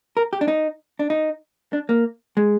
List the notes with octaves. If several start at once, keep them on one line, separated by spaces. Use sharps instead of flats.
A#4
G4
D4
D#4
D4
D#4
D4
A#3
G#3